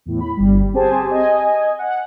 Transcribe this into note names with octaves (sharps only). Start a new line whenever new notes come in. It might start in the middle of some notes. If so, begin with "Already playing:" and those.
E2 A2
B5
G1 G3
C4 G4 G#4 C5 G#5 A5
D#5 G#5
F#5